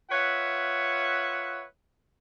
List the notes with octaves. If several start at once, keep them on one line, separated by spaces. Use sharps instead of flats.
F4 B4 C#5 E5 F#5